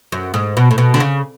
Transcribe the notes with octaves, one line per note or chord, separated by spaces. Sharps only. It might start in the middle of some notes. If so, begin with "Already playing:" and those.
F#2
G#2
B2
A2
B2
D3
C#3